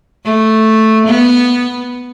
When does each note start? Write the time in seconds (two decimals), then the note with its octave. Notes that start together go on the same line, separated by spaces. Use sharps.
0.24 A3
1.07 B3